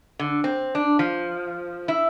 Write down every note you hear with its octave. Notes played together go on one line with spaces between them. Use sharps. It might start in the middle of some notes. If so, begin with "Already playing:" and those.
D3
C4
D4
F3
E4